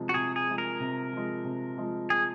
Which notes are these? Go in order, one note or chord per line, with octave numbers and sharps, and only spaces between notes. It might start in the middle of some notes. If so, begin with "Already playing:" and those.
Already playing: C3 F3 G#3
F#4
C3 G#4
G#4
F3 G#3
A#4
C3
F3 G#3
C3
F3 G#3
G#4